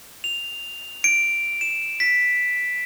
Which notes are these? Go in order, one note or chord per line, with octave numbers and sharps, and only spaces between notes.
F7
D7
E7
B6